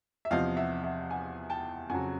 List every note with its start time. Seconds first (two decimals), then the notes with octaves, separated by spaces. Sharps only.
0.25 E5
0.31 E2 C3 F3 D#5 F5
0.57 E5 F#5
0.84 E5 F#5
1.10 F#5 G#5
1.50 G5 A5
1.90 F2 C#3 F#3 F#5 G#5